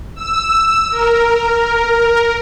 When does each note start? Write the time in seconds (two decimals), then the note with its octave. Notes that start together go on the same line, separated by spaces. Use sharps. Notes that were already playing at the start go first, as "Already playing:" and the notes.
0.14 E6
0.90 A#4